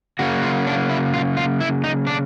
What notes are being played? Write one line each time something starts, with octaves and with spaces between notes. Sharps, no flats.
C#3 F#3 A#3 F#4
F4
D4
E4
F4
F4
E4
D#4
D4